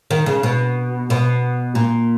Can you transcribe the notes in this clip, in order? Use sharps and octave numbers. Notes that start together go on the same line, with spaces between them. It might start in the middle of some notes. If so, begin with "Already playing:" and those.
D#3
C#3
B2
B2
A#2